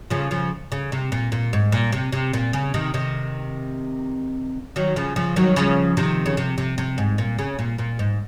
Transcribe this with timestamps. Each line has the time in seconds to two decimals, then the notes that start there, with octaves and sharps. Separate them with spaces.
0.10 C#3 F3
0.31 C#3 F3
0.72 C#3
0.92 C3
1.12 A#2
1.32 A#2
1.53 G#2
1.72 A#2
1.92 C3
2.12 C3
2.33 A#2
2.53 C#3
2.74 C3 D#3
2.94 C3 D#3
4.76 D#3 F#3
4.96 C#3 F3
5.16 C#3 F3
5.36 D#3 F#3
5.56 C#3 F3
5.97 C3 D#3
6.26 C#3
6.37 C3
6.58 C3
6.78 C3
6.98 G#2
7.18 A#2
7.39 C#3
7.59 A#2
7.78 A#2
7.99 G#2